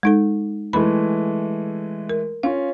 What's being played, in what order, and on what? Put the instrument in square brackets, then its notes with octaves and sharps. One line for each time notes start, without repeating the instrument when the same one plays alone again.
[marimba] G#3 D#4 A4
[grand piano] E3 G#3 A3 [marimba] B5
[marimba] A#4
[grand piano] C#4 F4 [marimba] F5